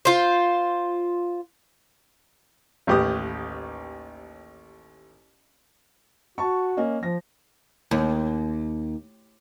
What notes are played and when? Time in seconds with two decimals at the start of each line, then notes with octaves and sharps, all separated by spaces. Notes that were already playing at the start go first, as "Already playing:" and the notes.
0.05 F4 C5
2.87 A1 D#2 G4 B4 D#6
6.38 F#4 A5 C#6
6.77 A#3 C#4 D#5
7.03 F3 A#6
7.91 D#2